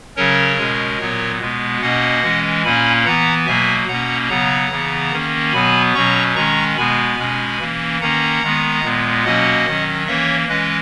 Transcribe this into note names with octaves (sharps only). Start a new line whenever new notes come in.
C#3 F#3 C#4 A#4 C#5
B2 G#3 C#4
A#2 F#3 B3
B2 G#3 B3
B2 A#3 C#4 D#5 F#5
E3 G#3 C#4
A#2 A#3 C#4 G#5 B5
E3 B3 F#5 A#5
B2 F#3 A#3 E5 G#5
B2 A#3 C#4 F#5 A#5
C#3 F#3 B3 F#5 A#5
C#3 E3 B3
D#3 A#3 C#4
B2 F#3 B3 G#5 B5
B2 F#3 C#4 A#5 C#6
D#3 G#3 C#4 A#5 C#6
B2 G#3 B3 G#5 B5
B2 G#3 C#4
E3 A#3 C#4
D#3 A#3 C#4 F#5 A#5
D#3 G#3 B3
A#2 G#3 B3
B2 F#3 A#3 C#4 D#5 F#5
D#3 F#3 C#4
E3 A#3 C#4 C#5 E5
E3 G#3 C#4 B4 D#5